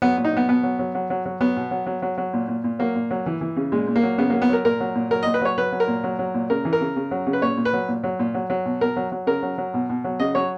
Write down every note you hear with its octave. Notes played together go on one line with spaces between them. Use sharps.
F#3 B3
A#2
D#4
F#3 B3
B2 B3
F#3
F#3
F#3
F#3
F#3
F#3 B3
B2
F#3
F#3
F#3
F#3
A#2
A#2
A#2
F#3 A#3
A#2
F#3
E3
E3
C#3
A#2 G#3
A#2
A#3
F#3
C#3 B3
F#3 A#3
B3
F#3 A#4
A#2 A#4
F#3
A#2
F#3 A#4
A#2 D#5
B4
F#3 C#5
F#3 B4
F#3
A#4
A#2
F#3
F#3
A#2
C#3 A#4
E3
A#4
C#3
C#3
F#3
C#3
B4
A#2 C#5
A#2
B4
F#3
A#2
F#3
A#2
F#3
F#3
B2
B2 A#4
F#3
F#3
C#3 A#4
F#3
F#3
B2
B2
F#3
C#3 D#5
F#3 C#5